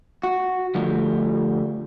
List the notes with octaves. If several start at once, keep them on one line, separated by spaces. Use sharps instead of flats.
F#4
D3 F3 G3 A3